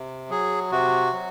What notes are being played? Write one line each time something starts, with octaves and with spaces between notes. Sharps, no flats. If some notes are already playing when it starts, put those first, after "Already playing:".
Already playing: C3
F#3 G#4
C3 F#4
F#3